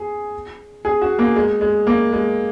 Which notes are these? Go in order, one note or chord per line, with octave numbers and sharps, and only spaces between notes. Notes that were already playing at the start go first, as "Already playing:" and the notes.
Already playing: G#4
G#4
F#4
A#3
G#3
G#3
A#3
G#3